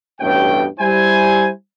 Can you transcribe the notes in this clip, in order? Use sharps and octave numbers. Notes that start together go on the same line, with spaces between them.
A1 G2 B2 A3 C#5 G5
G3 E4 C5 G#5